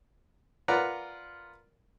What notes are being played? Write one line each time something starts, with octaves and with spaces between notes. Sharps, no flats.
F4 A#4 B4 D5 F#5 A#5